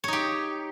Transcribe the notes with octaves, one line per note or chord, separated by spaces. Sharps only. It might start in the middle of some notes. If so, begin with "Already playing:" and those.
D#4 G4 C#5